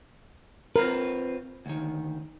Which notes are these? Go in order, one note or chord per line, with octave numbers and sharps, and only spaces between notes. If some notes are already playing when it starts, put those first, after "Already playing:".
C4 F4 A#4 B4
D2 D#3